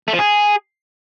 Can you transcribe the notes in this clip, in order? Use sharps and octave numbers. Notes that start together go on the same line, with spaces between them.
A3
F3
G#4